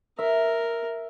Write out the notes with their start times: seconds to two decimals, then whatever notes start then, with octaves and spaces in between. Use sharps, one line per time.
0.19 A#4 E5